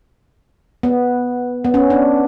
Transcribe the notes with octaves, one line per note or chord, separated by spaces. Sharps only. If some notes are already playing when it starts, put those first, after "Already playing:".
B3
B3
C#4
D4